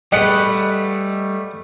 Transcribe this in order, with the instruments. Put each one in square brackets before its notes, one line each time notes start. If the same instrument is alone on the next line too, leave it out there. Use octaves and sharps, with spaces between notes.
[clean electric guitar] G3 [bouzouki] A3 F#5 [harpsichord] G4 G#4 B4 [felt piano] D#5 C#7